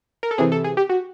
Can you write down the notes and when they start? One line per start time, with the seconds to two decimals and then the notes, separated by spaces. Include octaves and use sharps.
0.23 A#4
0.31 A4
0.38 C3 E3 G#4
0.52 A4
0.64 G#4
0.77 G4
0.90 F#4